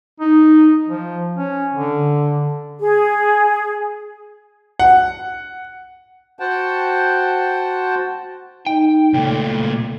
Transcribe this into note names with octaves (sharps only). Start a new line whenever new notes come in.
D#4
F3
C#4
D3
G#4
F#5
F#4 C5 F#5 G5 A5
D#4 G5
C#2 A#2 A3